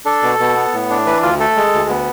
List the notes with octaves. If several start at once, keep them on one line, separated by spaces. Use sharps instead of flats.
D4 A4
B2
B2
B3
A2
D4
E3 B4
D2 F4
A3 A4
G#3
D2
B3